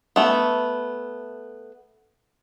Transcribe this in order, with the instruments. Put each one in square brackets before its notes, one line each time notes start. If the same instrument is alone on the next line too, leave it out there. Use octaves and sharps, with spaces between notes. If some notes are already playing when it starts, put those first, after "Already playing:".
[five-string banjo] A3 B3